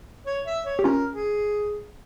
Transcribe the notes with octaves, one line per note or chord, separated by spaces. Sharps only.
C#5
E5
C#5
G4
C#4 F4 A#4
G#4